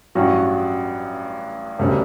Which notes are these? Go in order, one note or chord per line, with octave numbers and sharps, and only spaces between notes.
A1 G2 F#3 C#4 F#4
E1 D2 C#3 G3 D4